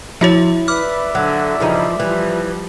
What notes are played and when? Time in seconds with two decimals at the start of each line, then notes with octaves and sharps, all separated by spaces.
0.21 F3 E4 F#4 C#5
0.68 B4 D5 E5 D6 F6
1.15 D3 F#3
1.60 G2 C#3 E3 F3 D#4
2.00 E3 F3 G3